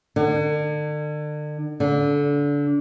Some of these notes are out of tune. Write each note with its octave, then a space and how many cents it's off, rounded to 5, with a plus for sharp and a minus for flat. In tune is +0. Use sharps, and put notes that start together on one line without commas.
D3 +40
D3 -25